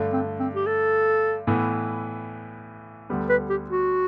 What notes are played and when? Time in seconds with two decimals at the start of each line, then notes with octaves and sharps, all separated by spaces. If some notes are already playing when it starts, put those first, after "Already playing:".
Already playing: G2 D3 A3
0.13 C4
0.40 C4
0.55 G4
0.67 A4
1.47 A2 E3 B3
3.10 D2 D3 G3 B3
3.30 B4
3.50 G4
3.70 F#4